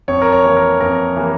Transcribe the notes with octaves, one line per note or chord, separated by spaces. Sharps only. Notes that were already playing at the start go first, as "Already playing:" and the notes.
F2 C#5
A#4
C#5
E3 A#3
A#4
F2 A#4
E3 A#3